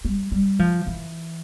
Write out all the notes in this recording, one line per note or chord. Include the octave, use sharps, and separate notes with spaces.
G3
G3
F3
E3